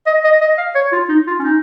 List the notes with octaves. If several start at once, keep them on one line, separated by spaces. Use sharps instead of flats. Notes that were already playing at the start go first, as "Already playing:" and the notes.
D#5
D#5
D#5
F5
C#5
F4
D#4
F4
C#4
D#4